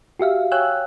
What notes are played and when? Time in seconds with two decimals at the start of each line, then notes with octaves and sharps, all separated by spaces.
0.19 F#4 G4 E5 F5
0.52 C#5 F5 G5 G#5 E6 F#6